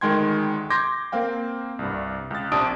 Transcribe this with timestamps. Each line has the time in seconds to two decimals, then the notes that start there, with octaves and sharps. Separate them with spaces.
0.01 D2 D#3 G#3 G5 C6 G#6
0.70 C6 D6 G6 G#6 A#6
1.12 A#3 C4 F5 G5
1.79 C2 G2
2.31 C#2 A6
2.51 A#1 C3 D4 A5 D#6 D7